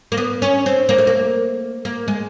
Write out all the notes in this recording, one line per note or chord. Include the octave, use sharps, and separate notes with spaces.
A#3
B3
C#4
C4
A#3
A3
A#3
A#3
G#3